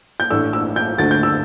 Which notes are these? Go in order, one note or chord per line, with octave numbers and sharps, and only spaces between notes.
G6
A1 A2 A3 D4 E6
E6
G6
D2 D3 A3 D4 A6
G6
E6